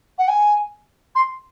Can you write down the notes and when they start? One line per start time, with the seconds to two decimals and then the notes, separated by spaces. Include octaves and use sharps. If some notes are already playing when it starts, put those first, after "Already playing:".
0.18 F#5
0.28 G#5
1.15 C6